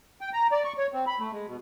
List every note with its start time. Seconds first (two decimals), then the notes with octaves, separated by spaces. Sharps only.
0.21 G5
0.33 A#5
0.52 D5
0.64 C#6
0.78 C#5
0.93 C4
1.07 B5
1.19 A3
1.32 G#3
1.48 B2